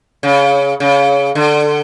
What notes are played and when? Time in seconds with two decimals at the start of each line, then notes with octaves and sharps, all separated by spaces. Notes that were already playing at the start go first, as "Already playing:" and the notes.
0.23 C#3
0.80 C#3
1.35 D3